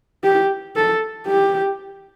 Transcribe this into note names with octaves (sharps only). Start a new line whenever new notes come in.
G4
A4
G4